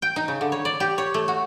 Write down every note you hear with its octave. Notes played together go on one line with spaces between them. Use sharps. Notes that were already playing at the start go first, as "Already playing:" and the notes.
G5
D#4
C#3
D3
C#5
D5
G4
C#5
A3
F#4